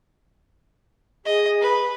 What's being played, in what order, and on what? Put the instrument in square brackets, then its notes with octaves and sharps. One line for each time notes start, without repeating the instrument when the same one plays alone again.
[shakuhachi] G#4 [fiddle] D#5
[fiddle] B4